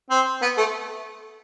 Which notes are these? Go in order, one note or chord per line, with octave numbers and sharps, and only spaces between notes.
C4
B3
A3